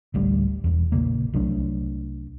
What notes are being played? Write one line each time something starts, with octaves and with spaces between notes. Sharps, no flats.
A1 D2 G3
E1 E2
A#1 C#3 A#3
C2 F#3 A3 D4